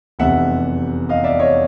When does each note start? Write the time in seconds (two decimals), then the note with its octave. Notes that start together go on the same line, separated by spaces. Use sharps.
0.19 F1 E2 C3 E5 F#5
1.09 D#5 F5
1.24 D5 E5
1.39 C#5 D#5